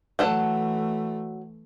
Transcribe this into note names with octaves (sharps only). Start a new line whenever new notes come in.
E3 F#3 A3 A4 F#5